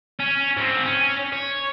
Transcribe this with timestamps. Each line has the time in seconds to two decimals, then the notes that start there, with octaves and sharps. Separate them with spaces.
0.19 C#4
0.57 G#2 C4
0.86 C#4
1.33 C#5